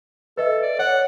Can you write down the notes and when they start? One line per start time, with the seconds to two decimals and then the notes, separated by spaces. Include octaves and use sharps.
0.37 A4 B4 D#5 E5
0.63 D5
0.79 C#5 F#5